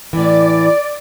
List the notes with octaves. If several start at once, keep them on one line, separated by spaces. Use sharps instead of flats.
A2 E3 D5